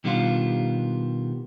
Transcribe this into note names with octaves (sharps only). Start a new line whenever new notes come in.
B2 D#3 G3 B3 D4 F4